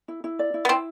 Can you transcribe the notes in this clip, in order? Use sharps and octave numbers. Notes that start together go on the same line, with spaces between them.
E4
E4
D5
E4
B3
C4 E4